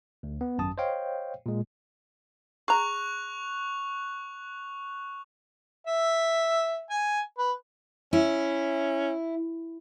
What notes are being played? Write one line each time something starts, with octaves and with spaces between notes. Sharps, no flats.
D2
B3
G#1 F#2 A5 D#6
C5 C#5 D#5 F5 G5
A#2 G#3
G#4 A#5 C#6 F#6 F7
E5
G#5
B4
C#4 E4